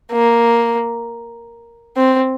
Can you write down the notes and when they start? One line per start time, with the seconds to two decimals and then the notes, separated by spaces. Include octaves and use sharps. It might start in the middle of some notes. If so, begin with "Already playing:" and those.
0.12 A#3
1.97 C4